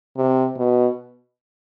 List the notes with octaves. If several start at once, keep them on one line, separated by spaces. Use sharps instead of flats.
C3
B2